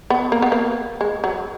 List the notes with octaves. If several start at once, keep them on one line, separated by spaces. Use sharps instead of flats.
B3
A#3
B3
A#3
G#3
F#3